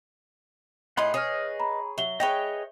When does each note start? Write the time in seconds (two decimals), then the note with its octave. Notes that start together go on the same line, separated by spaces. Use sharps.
0.97 A2 D#4 G#4 F#5 B5 C6
1.14 G#4 B4 C#5 D#5 D#6 F6
1.60 A#5 B5
1.98 F#3 E5 G7
2.20 G#4 B4 C#5 D#5 G5